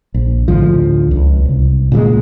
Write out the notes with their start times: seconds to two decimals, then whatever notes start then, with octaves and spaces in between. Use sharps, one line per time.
0.14 A#1
0.48 D2 A2 D3 F3
1.11 C#2
1.45 C2
1.92 A#2 C#3 F3 G#3